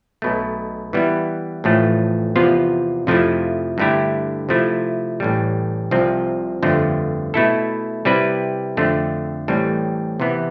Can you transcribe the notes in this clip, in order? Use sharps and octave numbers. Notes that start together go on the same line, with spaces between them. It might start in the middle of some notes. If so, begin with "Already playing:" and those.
B1 B2 A3
E3 G3 B3 E4
A1 A2 F3 A3
E2 C3 F3 B3 F4
F2 C3 F3 A3 E4
G2 D3 A3 E4 G4
C3 F3 A3 E4
A1 A2 G3
C2 C3 F3 C4
G1 F2 D3 A3 C4
B2 A3 E4 A4
C3 G3 C4 E4 B4
F2 D3 A3 C4
A1 A2 G3 C4
C3 E3 B3